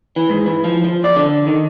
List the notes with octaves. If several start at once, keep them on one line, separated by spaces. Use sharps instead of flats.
E3
G#2
E3
F3
F3
D5
D3
D#3